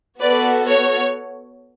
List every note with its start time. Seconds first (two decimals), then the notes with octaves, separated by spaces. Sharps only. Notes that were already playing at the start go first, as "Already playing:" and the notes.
0.20 B3 F#4 A4 B4 D5
0.68 C#5